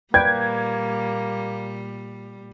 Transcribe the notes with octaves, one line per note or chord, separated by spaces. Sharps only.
A#2 G3 A#3 B4 D5 G5 G#6